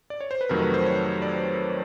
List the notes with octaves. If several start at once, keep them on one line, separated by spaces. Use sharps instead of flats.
D5
C#5
C5
B4
F2 C3 D#3 F#3 A3 A#4
B4
C5
C#5
D5